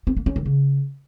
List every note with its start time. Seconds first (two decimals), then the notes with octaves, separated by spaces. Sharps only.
0.07 C4
0.17 A#3
0.26 C#4
0.36 D#3
0.46 C#3